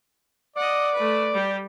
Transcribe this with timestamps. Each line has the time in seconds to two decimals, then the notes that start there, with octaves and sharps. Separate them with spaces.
0.56 D5 D#5 F#5
0.94 A3 B4
1.34 G3 G4